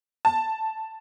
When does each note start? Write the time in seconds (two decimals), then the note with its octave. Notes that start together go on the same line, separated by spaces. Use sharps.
0.25 A5